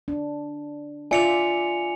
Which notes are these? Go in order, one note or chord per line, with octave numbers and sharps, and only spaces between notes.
D4
F4 D5 E5 G#5 C#7 F7